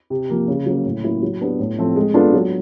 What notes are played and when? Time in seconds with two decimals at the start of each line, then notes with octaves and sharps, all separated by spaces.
0.10 C3
0.30 F3 A#3
0.48 C#3
0.66 F#3 A#3 C#4
0.85 A2
1.03 F#3 A#3 C#4 E4
1.23 F#3
1.41 B3 D4 G4 B4
1.59 A2
1.78 F3 A3 C4
1.96 G#3
2.14 B3 D4 F4 A4
2.33 F#3